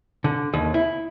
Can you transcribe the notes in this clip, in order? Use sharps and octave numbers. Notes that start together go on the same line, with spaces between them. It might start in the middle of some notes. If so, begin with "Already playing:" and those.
D3
D#2
E4